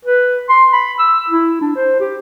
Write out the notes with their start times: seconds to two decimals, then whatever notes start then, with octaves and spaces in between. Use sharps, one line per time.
0.05 B4
0.49 C6
0.73 B5
0.99 E6
1.30 E4
1.61 D4
1.76 C5
2.00 G4